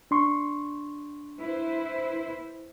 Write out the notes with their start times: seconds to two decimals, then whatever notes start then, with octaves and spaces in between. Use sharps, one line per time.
0.11 D4 C6 C#6
1.41 E4 B4 C5